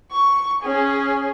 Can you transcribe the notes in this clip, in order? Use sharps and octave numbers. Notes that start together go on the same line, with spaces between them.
C#6
C#4 G#4